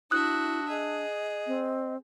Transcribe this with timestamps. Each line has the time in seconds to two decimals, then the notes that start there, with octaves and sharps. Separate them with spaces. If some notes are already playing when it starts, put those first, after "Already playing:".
0.11 D4 E4 F#4 E5 D#6 F#6
0.69 G#4 D#5
1.47 C4